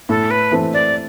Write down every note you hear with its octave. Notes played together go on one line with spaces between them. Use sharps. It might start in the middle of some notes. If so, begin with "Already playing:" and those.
A2 A4
B4
E3 A3 C4
D5